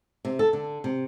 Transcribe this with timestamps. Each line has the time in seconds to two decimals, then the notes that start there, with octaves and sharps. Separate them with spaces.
0.25 C3
0.39 A4
0.53 D3
0.84 C3